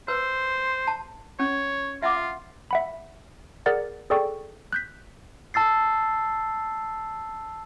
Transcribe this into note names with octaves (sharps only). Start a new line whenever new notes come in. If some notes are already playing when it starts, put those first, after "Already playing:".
B4 C5 E6
A5
C#4 C#5
F4 E5 F#5 D6
E5 F#5 B5
G#4 A#4 D5 F#5 A6
G#4 A4 D5 G5 C#6
F#6 G6 B6
A5 E6 A6 C7